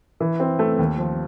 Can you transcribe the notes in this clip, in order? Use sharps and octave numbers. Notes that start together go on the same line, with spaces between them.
E3
C4
A3
D#2
F3